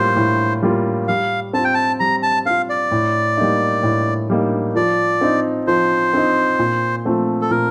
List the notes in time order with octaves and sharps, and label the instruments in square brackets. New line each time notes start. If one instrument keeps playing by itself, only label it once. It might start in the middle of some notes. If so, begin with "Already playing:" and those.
Already playing: [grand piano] A2 G3 A#3 F4 [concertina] C5
[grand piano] A2
G3 A#3 F4
[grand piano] G3 [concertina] F5
[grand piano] C4 [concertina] A5
[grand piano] F4
[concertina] G5
A5
[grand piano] G3 [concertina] A#5
[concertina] A5
[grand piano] C4 F4 [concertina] F5
[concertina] D5
[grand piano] A2
G3 A#3 D#4
A2
G3 A#3 D#4
[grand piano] F3 [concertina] D5
[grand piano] C4 D#4
[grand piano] F3 [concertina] C5
[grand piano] C4 D#4
A#2
F3 A3 C4
[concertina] A4
[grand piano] A#2 [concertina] A#4